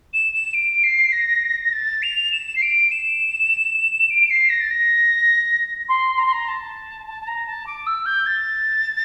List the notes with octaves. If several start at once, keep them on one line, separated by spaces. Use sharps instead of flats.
E7
E7
D7
C7
A#6
A6
F7
E7
C7
D7
E7
D7
C7
A#6
A6
A#6
C6
A#5
C6
A#5
A5
A5
A5
A#5
A5
D6
E6
G6
A6